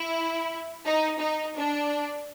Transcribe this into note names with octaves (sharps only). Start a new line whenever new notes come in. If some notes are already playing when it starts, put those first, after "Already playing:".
Already playing: E4
D#4
D#4
D4